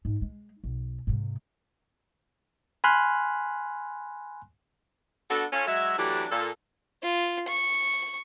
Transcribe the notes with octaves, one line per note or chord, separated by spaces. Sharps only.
G#2
G#3
B1
G#2 C3
G#5 B5 C6 F6 F#6
B3 D4 F#4 A4
C#4 F4 A4
F#3 G#3 F#4 E5
E3 F#3 A3 D4 E4 G4
A#2 A4
F4
C#6